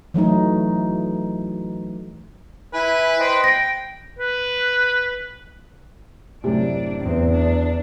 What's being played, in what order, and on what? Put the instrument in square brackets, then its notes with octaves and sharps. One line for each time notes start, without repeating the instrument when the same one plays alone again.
[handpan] E3 F#3 A3 D#4
[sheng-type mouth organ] E4 G#5 [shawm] B4
[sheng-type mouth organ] C5 D#5 G5
[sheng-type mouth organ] G5 [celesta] A#6 D7
[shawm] B4
[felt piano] F#2 A2 C3 [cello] D4 D5
[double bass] E2 [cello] C4
[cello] D4